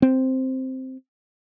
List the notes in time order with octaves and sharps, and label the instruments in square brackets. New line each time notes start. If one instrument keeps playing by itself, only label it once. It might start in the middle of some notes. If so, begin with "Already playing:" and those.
[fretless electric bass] C4